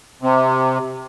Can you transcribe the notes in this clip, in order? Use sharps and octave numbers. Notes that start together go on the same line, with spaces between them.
C3